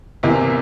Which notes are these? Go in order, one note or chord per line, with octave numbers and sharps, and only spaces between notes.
E2 C3 E3 A#3 E4